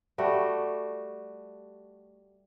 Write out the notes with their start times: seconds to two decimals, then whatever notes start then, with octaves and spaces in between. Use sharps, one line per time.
0.18 G3 A3 F#4